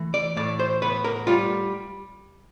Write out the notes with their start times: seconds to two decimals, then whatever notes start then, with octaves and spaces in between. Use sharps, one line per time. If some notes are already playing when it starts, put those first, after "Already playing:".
Already playing: E3 A3
0.14 D5
0.37 A2 D5
0.59 C5
0.82 B3 B4
1.04 A#4
1.27 G3 F4